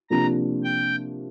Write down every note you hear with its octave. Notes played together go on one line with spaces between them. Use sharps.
C3 F3 A#3 D4 F4 A#5
G5